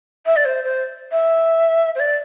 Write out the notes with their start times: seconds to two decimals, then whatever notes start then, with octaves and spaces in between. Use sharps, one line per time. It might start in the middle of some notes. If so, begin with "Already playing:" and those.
0.26 E5
0.36 D5
0.45 C5
0.64 C5
1.12 E5
1.95 C5
2.00 D5